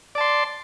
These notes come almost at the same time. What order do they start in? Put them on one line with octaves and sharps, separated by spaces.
D5 A5 C6